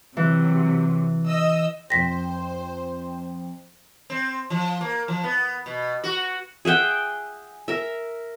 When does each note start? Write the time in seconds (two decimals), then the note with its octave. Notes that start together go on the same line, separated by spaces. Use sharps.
0.17 C3 E3 F#3
1.27 D#5 E6
1.90 F2 C5 G5 A#6 B6
4.10 C4
4.50 F3
4.81 A#3
5.08 F3
5.23 B3
5.66 B2
6.04 F#4
6.65 G#4 E5 F#5 G5
7.68 A#4 E5